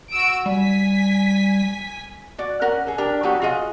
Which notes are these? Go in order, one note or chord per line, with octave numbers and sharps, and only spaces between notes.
F#4 E6 D7
G3 G#5 B6
F#4 D5
C#4 A#4 F#5
G#4 A4
D4 G4 A#4
F#3 B3 F#4 G4
F4 F#4 G#4 D#5